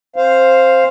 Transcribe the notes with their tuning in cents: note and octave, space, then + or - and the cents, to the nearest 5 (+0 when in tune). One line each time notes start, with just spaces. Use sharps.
C4 +40 C5 +0 F5 -5